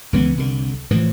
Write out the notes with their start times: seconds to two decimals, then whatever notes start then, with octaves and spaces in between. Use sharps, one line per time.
0.13 C#2 E3 B3
0.37 C2 D3
0.91 A2 E3 F3